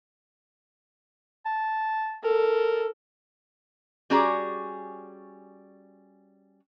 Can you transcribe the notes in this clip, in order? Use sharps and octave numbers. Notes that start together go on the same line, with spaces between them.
A5
A4 A#4
G3 C#4 F#4 G#4 D5 A#5